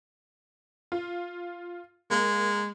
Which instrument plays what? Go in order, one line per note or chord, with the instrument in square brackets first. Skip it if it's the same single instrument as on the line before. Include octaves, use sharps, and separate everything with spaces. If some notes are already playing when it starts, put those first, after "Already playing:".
[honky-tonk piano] F4
[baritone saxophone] G#3 [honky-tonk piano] A#3 A#4